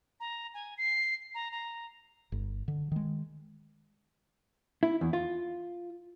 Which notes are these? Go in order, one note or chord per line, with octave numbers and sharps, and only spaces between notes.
A#5
G#5
C7
A#5
A#5
G1
D3
D#3 G#3
E4
E2
F4